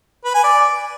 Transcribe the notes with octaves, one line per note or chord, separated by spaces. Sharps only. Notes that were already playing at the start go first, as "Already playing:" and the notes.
B4
G#5
D5